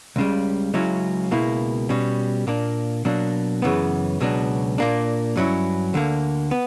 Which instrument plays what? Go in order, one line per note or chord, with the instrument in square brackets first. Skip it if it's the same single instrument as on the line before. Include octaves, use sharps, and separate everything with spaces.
[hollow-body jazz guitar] C#2 C#3 G3
C#2 C#3 F#3 C#4 E4
C#2 B2 A#3 E4
B2 G3 C#4
A#2 A#3 D4
B2 F#3 A#3 D4
F#2 C#3 E3 B3
C#2 B2 F#3 B3 D4
A#2 A#3 D4
G2 F#3 C#4 E4
D2 D3 A#3
B3